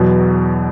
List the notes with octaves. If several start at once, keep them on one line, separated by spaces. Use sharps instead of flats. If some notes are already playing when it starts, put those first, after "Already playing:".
Already playing: E2 B2 F#3 B3